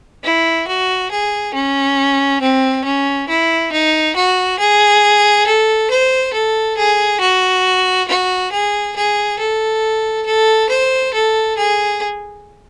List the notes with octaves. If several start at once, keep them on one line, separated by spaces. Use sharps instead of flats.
E4
F#4
G#4
C#4
C4
C#4
E4
D#4
F#4
G#4
A4
C5
A4
G#4
F#4
F#4
G#4
G#4
A4
A4
C5
A4
G#4